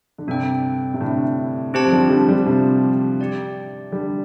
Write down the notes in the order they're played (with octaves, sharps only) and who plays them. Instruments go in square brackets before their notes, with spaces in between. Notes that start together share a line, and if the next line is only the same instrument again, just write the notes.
[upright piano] D3
[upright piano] G2 C3 [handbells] D4 A4 D5 G5
[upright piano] C3
A2 D3
[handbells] C4 G4 C5 A5
[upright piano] F3
D3 G3
D3 G3
D3 G3
C3 F3
[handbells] G4 D5 G5
[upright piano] D3 G3